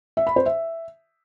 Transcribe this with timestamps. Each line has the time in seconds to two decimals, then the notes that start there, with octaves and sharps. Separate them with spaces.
0.17 E5
0.27 B5
0.36 C5
0.46 E5